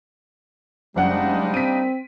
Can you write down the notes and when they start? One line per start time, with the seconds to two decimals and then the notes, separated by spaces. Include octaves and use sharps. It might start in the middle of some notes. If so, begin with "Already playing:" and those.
0.96 F#1 G3 G#3 A#3 D4 D#4 F#5
1.54 C4 B6 D7 D#7